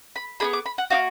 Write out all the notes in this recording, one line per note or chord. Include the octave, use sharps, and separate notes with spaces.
B5
B3 D4 G#4 B5
D6
B5
F#5
A#3 D#4 F#4 F5